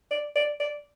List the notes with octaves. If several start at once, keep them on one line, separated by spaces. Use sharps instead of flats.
D5
D5
D5